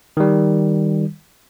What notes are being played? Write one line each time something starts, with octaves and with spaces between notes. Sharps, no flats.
D#3 G3